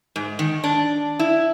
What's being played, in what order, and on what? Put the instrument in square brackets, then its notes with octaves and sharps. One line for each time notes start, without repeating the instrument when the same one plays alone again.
[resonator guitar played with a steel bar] G#2
D#3
D4
E4